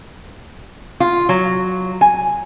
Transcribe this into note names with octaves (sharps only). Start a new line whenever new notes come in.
F4
F#3
G#5